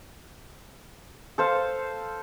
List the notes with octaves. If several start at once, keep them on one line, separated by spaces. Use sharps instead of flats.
A4 C5 F5